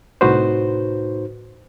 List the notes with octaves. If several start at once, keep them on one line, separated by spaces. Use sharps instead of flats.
C2 A2 D#4 F#4 B4 C5